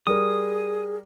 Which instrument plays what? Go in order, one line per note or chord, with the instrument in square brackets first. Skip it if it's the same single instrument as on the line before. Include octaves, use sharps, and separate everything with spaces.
[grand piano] G3 A#4 [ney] G#4 [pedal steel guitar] D#6